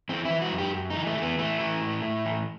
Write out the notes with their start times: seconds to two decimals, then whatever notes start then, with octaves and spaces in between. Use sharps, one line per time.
0.09 E3 C4
0.25 E4
0.31 E3
0.42 F#4
0.52 F#2
0.58 G4
0.74 F#2
0.90 D#4
0.95 E3
1.07 A3
1.17 E3
1.22 B3
1.38 E3 A3
1.60 E3
1.82 A2
2.03 A2
2.25 E3